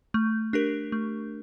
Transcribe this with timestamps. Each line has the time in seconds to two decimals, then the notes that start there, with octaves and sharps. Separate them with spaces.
0.14 A3
0.53 D4 G4 A#4
0.92 A3